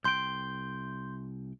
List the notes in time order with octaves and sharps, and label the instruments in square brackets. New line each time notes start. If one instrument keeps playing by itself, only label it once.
[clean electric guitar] C2 G5 [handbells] C6 G6